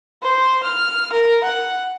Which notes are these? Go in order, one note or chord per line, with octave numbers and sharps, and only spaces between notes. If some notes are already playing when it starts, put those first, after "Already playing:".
C5
F6
A#4
F#5